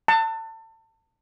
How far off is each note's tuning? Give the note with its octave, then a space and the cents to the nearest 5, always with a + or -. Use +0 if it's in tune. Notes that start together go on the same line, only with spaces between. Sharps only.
A5 +30